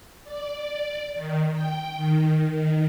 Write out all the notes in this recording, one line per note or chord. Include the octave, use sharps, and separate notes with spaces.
D5
D#3
G5
D#3
D#3